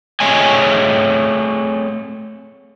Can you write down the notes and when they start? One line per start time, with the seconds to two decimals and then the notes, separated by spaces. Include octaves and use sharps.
0.20 A3 C4 G#4 C#5 D#5 G#5